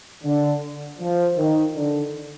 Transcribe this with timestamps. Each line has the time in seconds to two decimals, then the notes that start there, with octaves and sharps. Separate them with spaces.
0.24 D3
0.99 F3
1.37 D#3
1.75 D3